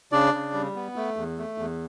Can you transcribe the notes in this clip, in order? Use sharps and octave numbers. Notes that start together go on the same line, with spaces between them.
C#3 D4 D5
C#3
G3
B3
A3
E2
A3
E2